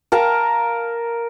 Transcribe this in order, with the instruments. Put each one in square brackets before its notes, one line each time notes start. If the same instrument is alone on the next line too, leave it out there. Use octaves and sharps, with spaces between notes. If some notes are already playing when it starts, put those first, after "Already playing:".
[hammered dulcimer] A#4 F5 A5 A#5